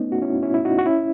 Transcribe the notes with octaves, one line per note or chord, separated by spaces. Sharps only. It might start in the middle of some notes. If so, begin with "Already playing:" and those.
Already playing: A3 B3 C#4 D#4
F#4
C#4 E4
C#4 E4
E4
D#4 F#4
F#4
C#4 E4